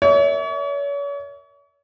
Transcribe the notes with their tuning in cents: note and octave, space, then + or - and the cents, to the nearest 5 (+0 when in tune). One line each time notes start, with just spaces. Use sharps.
A#4 +0 C#5 +40 E5 -30